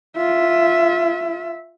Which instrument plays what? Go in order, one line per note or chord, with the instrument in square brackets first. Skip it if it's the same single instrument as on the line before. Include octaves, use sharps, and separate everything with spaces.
[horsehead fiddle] F4 E5